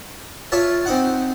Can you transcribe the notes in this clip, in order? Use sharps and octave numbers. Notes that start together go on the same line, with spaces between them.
F4 C#5 E5 A5
C4 D#4 F#5